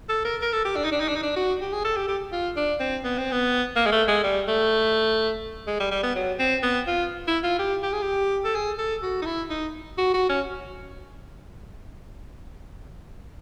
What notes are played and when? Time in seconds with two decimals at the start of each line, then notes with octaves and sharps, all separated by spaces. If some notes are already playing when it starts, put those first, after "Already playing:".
0.09 A4
0.25 A#4
0.41 A#4
0.53 A4
0.65 G4
0.76 D4
0.84 D#4
0.92 D4
1.00 D#4
1.08 D4
1.16 D#4
1.23 D4
1.36 F#4
1.61 G4
1.73 G#4
1.85 A4
1.96 G4
2.08 G4
2.32 F4
2.57 D4
2.80 C4
3.04 B3
3.18 C4
3.32 B3
3.76 A#3
3.86 G#3
3.92 A3
4.08 G#3
4.23 G3
4.48 A3
5.67 G#3
5.80 G3
5.91 G3
6.03 B3
6.15 F#3
6.39 C4
6.63 B3
6.87 F4
7.27 E4
7.43 F4
7.59 G4
7.83 G4
7.93 G#4
8.02 G4
8.44 A4
8.55 G#4
8.79 A4
9.02 F#4
9.22 D#4
9.26 E4
9.50 D#4
9.98 F#4
10.14 F#4
10.29 C#4